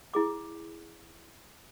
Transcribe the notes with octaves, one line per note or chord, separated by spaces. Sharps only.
E4 G#4 D6